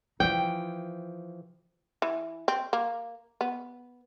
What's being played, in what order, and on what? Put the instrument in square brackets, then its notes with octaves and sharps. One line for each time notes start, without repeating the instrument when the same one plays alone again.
[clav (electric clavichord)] E3 F3 [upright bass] D#4 F4 [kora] G5
[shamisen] E3
C4
A#3
B3